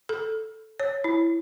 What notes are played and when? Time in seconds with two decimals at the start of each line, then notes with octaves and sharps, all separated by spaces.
0.09 A4
0.80 C#5
1.04 E4